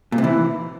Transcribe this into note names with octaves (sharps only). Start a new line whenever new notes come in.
A#2
C3
E3